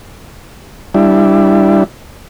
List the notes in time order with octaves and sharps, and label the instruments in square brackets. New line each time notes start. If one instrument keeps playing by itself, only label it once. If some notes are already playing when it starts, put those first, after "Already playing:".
[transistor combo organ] G3 D4 E4